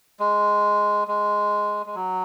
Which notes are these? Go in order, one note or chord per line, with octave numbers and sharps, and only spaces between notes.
G#3
G#3
G#3
F#3